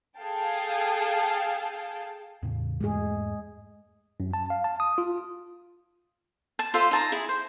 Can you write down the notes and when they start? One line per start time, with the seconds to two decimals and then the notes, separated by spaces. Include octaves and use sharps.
0.19 G#4 A4 F5 G5 A5
2.43 E2 A2 C#3
2.80 E2 G#2 G#3 A3 G#4
4.20 F#2
4.34 A5
4.50 F5
4.64 A5
4.80 D#6
4.98 F4
6.59 A5
6.74 F4 A4 C5 E5
6.91 D#4 A5 A#5
7.12 E4 G#4
7.29 C5